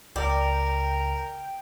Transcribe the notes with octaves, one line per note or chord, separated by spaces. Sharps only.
C#2 A#4 D5 G5